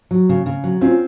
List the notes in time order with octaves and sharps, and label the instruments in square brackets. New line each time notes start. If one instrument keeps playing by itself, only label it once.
[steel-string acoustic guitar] F#3
C#3
C#3
F#3
[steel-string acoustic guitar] C4 [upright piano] C#4 F4